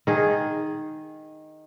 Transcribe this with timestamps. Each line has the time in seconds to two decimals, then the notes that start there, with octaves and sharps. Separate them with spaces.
0.07 D#3 G#4